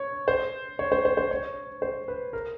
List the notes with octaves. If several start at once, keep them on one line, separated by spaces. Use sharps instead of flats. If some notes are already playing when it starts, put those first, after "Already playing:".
Already playing: C#5
C5
C#5
C5
C5
C5
C#5
C5
B4
A#4